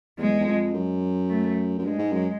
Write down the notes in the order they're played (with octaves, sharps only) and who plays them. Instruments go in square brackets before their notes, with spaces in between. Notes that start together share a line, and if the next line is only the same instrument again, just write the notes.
[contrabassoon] E2 [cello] G#3
[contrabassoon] E2
F2
F#2
[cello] A3
[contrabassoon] F#2
[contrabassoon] G2 [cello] G#3
[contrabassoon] G#2
F#2